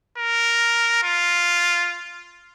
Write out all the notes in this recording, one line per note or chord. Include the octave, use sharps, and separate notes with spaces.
A#4
F4